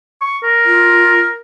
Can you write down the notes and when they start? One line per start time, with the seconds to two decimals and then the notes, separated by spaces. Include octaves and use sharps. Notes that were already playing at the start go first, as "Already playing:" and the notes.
0.21 C#6
0.43 A#4
0.65 F4